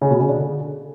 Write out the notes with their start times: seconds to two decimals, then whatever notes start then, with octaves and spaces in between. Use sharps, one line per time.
0.01 C#3
0.11 B2
0.20 C#3
0.29 D4
0.38 D3